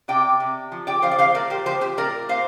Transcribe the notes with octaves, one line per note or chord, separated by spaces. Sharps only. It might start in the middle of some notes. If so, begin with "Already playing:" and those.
C3 D5 G5
C3
F3
D5 G5
F3 C5 F5
D5
C5 F5
A#2 A#4 D5
G4 C5
F3 G4 C5
G4 C5
A#2 A#4 D5
A#2 C5 F5